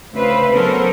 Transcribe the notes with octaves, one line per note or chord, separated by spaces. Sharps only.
D2 C#3 B4 C5 E5 F5
F#3 B3 C#4 A4 A#4 C5